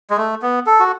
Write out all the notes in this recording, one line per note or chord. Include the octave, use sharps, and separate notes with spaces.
G#3
A3
B3
A4
F#4